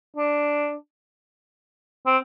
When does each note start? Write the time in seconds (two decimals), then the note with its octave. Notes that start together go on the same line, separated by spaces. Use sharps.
0.17 D4
2.06 C4